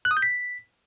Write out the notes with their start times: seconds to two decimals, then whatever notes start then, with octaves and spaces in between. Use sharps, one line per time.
0.05 F#6
0.11 D#6
0.17 G6
0.22 B6